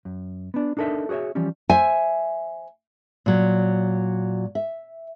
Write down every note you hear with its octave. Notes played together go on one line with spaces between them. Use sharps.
F#2
B3 D4
D4 D#4 A4 A#4 E5
F#4 G#4 C5 C#5 E5
E3 F3 G3 C#4
C5 E5 G#5
A#2 F#3
E5